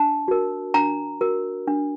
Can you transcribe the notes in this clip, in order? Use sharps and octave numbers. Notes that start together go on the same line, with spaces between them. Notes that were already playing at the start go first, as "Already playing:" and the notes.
Already playing: D4 A5
F#4 A#4
D4 A#5
F#4 A#4
D4